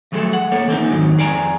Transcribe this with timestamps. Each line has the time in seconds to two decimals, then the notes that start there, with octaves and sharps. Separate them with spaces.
0.12 F3 F#3 A3 F#4 G#4 A4
0.33 F#5
0.52 A#3 A4 C#5
0.67 E3 A#3 C4 D#4
0.90 F2 G#2 D#3 F#3
1.18 F2 G#4 D5 G#5 A#5